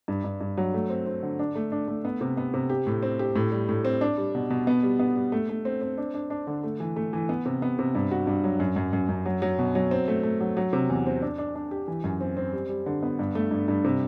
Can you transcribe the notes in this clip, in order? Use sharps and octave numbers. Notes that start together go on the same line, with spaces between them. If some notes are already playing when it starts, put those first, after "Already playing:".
G2
G2
G2
F#3
A3
C4
C4
D3
D4
A3
D4
A3
B3
C3
B3
C3
G4
A2
C4
G4
A2
G3
A2
C4
D4
G3
B2
B2
B3
G3
B3
G3
A3
A3
C4
C4
D4
D4
D4
D3
A3
E3
A3
E3
B3
C3
B3
C3
G2
F#4
G2
F#3
F#2
F#2
F#2
F#2
F#3
F#3
B2
F#3
C4
A3
A3
F#3
F#3
C3
E2
C4
D4
D4
D4
G4
E3
F#2
C4
C4
G3
G3
D3
B3
G2
A3
G2
G2
C3